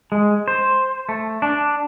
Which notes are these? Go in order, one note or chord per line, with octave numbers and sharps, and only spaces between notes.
G#3
C5
A3
D4